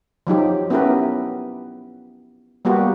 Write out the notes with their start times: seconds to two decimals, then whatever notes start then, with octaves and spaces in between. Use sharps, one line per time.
0.27 F3 F#3 D#4 G4
0.70 B3 C#4 E4 G4 A#4 B4
2.65 G3 A#3 B3 F#4 G4